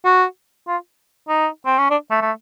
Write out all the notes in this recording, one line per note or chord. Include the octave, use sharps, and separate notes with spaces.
F#4
F4
D#4
C4
C#4
D4
A3
A3